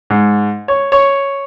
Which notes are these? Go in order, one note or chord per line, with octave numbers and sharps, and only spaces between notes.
G#2
C#5
C#5